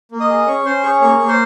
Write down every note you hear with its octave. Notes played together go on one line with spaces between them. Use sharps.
A#3
D#5 D#6
G#4
C#4 C#5 C#6
C#4 C5 C6
G#4 C#5 C#6
A#3 C#5 C#6
A#3
C5 C6